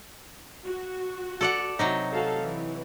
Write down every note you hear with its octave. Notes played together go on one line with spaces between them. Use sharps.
F#4
A4 D5 F#5
C3 F#3 D#4
F#4 A4 F5
E3